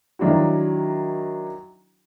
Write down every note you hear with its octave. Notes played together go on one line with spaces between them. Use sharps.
D#3 F#3 D4 E4 F#4